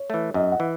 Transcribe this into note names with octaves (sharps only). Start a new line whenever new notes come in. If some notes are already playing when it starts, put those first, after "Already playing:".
Already playing: C#5
E3 A3
F#2 D#5
F#5
E3